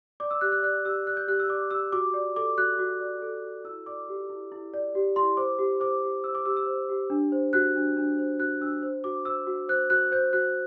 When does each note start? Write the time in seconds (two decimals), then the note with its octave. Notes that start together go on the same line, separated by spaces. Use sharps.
0.20 D5 D6
0.31 E6
0.41 G4 F#6
0.52 F#6
0.63 D5 F#6
0.85 G4 E6
1.07 D5 F#6
1.17 G6
1.28 G4 F#6
1.39 E6
1.49 D5 D6
1.71 G4 E6
1.92 F#4 D6
2.14 D5
2.36 A4 D6
2.58 F#4 F#6
2.79 F#4
3.01 D5
3.22 A4
3.44 F#4
3.65 E4 E6
3.86 D5 D6
4.09 G4
4.29 E4
4.52 E4
4.73 D5
4.95 G4
5.16 E4 C6
5.37 C5 D6
5.59 G4
5.80 C5 D6
6.03 G4
6.24 C5 E6
6.35 D6
6.45 G4 E6
6.57 E6
6.66 C5
6.89 G4
7.10 D4
7.32 C5
7.53 F#4 F#6
7.75 D4
7.97 D4
8.19 C5
8.40 F#4 F#6
8.60 D4 E6
8.83 C5
9.04 F#4 D6
9.25 C5 E6
9.47 F#4
9.68 C5 F#6
9.90 F#4 F#6
10.12 C5 G6
10.33 F#4 F#6